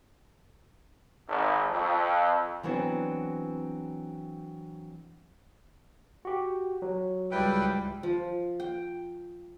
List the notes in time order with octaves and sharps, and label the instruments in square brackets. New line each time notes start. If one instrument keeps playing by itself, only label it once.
[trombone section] G#1
F2
[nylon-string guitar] E3 F#3 B3 C4 D4
[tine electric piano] F#4 G4
F#3
[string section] C#2 G#2 G3 [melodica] E4 B4 G5
[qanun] F3
G5